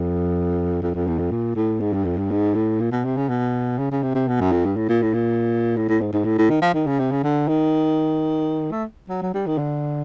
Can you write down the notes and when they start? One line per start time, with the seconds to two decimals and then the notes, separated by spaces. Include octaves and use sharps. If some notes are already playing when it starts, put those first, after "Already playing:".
Already playing: F2
0.82 F2
0.94 F2
1.07 E2
1.19 F2
1.31 A#2
1.56 A2
1.80 G#2
1.93 G2
2.05 F2
2.17 G2
2.31 G#2
2.55 A2
2.80 A#2
2.92 B2
3.05 C3
3.17 C#3
3.29 B2
3.78 C#3
3.91 C#3
4.03 C3
4.15 C3
4.28 B2
4.40 F#2
4.52 F2
4.65 G2
4.77 A2
4.89 A#2
5.02 A2
5.14 A#2
5.76 A2
5.89 A2
6.01 G#2
6.13 G#2
6.25 A2
6.38 A2
6.50 D#3
6.62 F3
6.74 D#3
6.87 C#3
7.00 C3
7.11 C#3
7.24 D3
7.48 D#3
8.71 A3
9.09 F#3
9.22 F#3
9.34 G3
9.47 D#3
9.58 D3